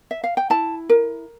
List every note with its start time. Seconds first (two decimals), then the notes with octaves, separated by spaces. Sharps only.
0.11 E5
0.24 F5
0.37 G5
0.50 E4 A5
0.89 A#4